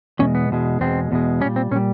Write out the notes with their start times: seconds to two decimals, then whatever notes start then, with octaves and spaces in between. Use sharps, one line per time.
0.19 E2 B2 G#3 C#4
0.35 B3
0.50 E2 B2 G#3
0.80 E2 B2 G#3 C4
1.11 E2 B2 G#3
1.41 G3 C#4
1.45 A#2
1.56 C4
1.71 A#2 C#4
1.76 G3